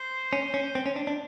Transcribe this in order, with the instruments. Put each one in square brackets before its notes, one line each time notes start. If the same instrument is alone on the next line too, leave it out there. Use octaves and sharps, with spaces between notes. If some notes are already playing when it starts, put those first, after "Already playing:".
Already playing: [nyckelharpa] C5
[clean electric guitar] C#4
C#4
C4
C#4
D4
D4